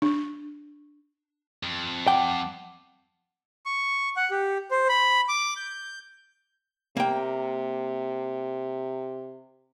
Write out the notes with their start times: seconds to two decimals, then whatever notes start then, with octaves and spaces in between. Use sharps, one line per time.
0.02 D4
1.63 F2
2.08 F#5 G5 A5 D6
3.66 C#6
4.16 F#5
4.31 G4
4.71 C5
4.89 B5
5.29 D6
5.57 G6
6.97 C3 A#3 G5